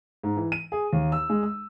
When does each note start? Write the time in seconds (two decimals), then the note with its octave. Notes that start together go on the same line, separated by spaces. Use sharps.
0.24 G#2
0.37 E3
0.52 D#7
0.72 G#4
0.93 D#2
1.12 E6
1.30 G#3
1.43 E6